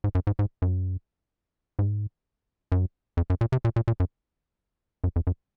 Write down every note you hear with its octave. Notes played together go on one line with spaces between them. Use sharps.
G#2
F#2
G#2
G#2
F#2
G#2
F#2
F2
F#2
A#2
C3
A#2
A#2
A#2
F#2
F#2
F2
F#2